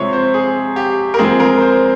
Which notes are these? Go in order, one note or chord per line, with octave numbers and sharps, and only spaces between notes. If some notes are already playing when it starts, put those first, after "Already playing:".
Already playing: C3 F3 G#3 C4 C#5 E5
C5
G#4
G4
A#4
F3 G#3 C4 G#4
A#4
C5